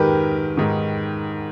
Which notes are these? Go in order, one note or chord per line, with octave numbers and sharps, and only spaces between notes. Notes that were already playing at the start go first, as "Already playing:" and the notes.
Already playing: G#2 D#3 G4 A#4 B4
G#2 D#3